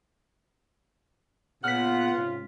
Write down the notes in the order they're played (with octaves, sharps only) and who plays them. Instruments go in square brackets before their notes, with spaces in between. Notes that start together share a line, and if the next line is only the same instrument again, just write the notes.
[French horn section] A#2 B3 [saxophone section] C#3 F#5 [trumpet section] F4 [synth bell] F6 B6
[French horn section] G#2 C3 C#4